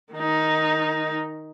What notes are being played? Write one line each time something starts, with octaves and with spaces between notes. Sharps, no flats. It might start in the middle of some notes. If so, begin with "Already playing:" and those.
D#3 D#4